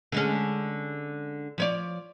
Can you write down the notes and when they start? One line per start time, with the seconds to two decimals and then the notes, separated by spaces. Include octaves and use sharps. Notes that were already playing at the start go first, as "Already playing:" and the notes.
0.12 D3 G#3 C#4
1.58 F3 C#5 D5